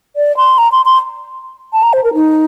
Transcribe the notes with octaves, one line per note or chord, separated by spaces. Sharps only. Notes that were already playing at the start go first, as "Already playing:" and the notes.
D5
C6
A#5
C6
C6
A5
A#5
C5
A#4
D#4